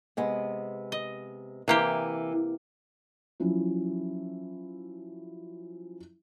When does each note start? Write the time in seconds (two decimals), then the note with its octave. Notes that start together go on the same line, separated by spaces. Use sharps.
0.17 C3 G#3 B3
0.92 D#5
1.68 C3 E3 A#3 G4
3.40 F3 F#3 C#4 E4